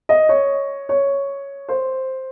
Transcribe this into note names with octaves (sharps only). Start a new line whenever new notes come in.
D#5
C#5
C#5
C5